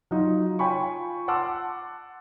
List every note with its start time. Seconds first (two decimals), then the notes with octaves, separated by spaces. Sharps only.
0.11 F#3 D#4 F4
0.59 F4 C#5 G5 G#5 B5 C#6
1.28 F#5 A5 C6 D6 E6